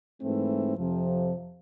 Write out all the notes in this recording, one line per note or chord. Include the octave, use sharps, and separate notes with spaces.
G#2 E3 A3 C4
F2 C3 F3